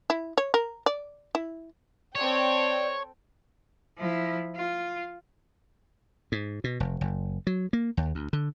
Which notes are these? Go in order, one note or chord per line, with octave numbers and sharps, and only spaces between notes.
E4
C#5
A#4
D5
E4
C4 A4 C#5 D5 G5
F3 E4
F4
G#2
B2
F1
F#1
F#3
A#3
D#2
D2
D3